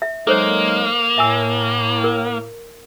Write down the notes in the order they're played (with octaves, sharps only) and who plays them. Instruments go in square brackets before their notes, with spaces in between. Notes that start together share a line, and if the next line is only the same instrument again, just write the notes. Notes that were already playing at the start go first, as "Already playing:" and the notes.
[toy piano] E5
[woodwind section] F#3 G#3 D#4 [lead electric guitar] A#3 [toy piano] A4 C5 C#5
[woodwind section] A2 [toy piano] E5 G#5 E6
[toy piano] A#4